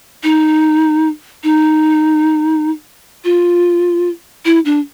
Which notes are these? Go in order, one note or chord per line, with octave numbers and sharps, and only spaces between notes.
D#4
D#4
F4
E4
D4